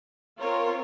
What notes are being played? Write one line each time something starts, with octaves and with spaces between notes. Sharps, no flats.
C4 F4 A#4 C#5